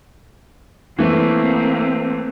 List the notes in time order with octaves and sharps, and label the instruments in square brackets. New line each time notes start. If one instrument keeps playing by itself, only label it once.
[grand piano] E3 A3 [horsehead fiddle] A#3 C4